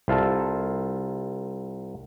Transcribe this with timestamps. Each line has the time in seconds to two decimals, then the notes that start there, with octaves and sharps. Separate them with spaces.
0.08 C2 F4 A4 A5